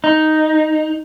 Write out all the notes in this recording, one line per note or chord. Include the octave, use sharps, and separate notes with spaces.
D#4